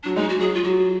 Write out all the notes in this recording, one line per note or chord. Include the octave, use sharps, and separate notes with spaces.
F#3 D4
G#3 D#4
F#4
F#3 G#4
F4
F#3 F#4